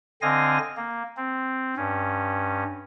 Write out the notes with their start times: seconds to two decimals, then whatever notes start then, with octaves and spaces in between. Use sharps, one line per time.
0.22 D3 C4 D#5 F5 G#5 A#6
0.77 A#3
1.17 C4
1.77 G2 C#4